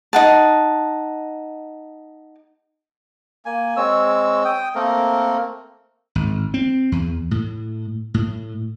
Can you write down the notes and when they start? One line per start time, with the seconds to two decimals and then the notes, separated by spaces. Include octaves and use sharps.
0.13 D#4 F#5 A5
3.46 A#3 G#5
3.77 G#3 C4 C#5 E6
4.45 G5 D#6
4.75 A3 A#3 C4 A#4
6.15 G#1
6.54 C4
6.92 E2
7.31 A2
8.14 A2